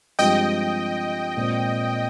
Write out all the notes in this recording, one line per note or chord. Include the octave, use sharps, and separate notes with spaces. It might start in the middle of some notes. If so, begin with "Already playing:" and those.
G2 F3 G#3 C4 G4 D#5 G5
A#2 G#3 C4